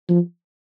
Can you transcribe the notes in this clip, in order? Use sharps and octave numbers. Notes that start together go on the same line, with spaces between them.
F3